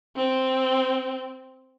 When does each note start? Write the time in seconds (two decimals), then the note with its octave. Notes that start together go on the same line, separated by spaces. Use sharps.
0.16 C4